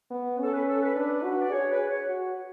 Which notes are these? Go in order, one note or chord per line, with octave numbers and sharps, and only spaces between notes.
B3
C#4 A4
B4
A4
B4
D4 B4
F#4
D5
G#4 C#5
B4
C#5
F#4